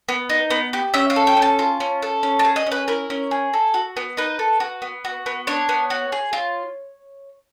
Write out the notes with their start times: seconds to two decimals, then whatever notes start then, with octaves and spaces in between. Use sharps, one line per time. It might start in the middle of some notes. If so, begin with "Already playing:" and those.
0.09 B3
0.30 D#4
0.50 B3
0.73 G4
0.94 C#4 E5
1.10 F5
1.16 A4
1.27 G5
1.37 C#4
1.42 A5
1.59 F4
1.80 C#4
2.02 A4
2.23 C#4
2.39 A5
2.45 G#4
2.56 D#5
2.67 C#4 B4
2.88 E4 A#4
3.10 C#4
3.31 G#4
3.53 A4
3.74 F#4
3.97 B3
4.17 D#4 B4
4.39 A4
4.60 F#4
4.82 B3
5.05 F#4
5.26 B3
5.47 D4 C#5
5.69 B3
5.90 F#4
6.12 G#4
6.33 F4